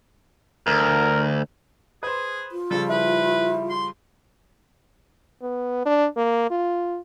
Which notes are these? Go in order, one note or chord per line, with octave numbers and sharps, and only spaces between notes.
D2 A#4
G#4 B4 C5
F4
C#3 F3 G3 A4
E4 B4
C6
B3
D4
A#3
F4